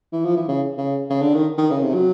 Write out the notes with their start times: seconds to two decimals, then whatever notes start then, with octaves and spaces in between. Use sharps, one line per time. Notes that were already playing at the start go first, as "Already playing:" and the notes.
0.13 E3
0.25 F3
0.37 E3
0.49 C#3
0.78 C#3
1.10 C#3
1.22 D3
1.34 D#3
1.58 D#3
1.71 C#3
1.83 C3
1.94 F#3